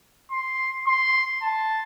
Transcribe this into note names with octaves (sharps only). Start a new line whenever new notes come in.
C6
C6
A5